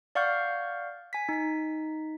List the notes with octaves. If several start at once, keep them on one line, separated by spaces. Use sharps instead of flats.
D5 F5 F#5 C#6 F6 G6
G#5 B6
D#4 B6